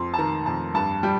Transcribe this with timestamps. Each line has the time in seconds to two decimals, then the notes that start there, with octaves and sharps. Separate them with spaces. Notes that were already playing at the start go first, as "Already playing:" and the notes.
Already playing: F2 F3 C6
0.14 A5
0.19 D#3 A#5
0.46 F2 A5
0.74 G2 A5
1.03 G3 G5